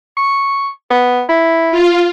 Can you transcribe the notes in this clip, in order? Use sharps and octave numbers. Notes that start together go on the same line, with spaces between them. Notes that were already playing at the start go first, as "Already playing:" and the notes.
C#6
B3
E4
F4